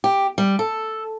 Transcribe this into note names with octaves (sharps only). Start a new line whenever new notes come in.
G4
G3
A4